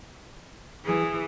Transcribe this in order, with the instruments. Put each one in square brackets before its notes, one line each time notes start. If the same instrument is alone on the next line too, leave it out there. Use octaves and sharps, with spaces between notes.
[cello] E3 [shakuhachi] G#4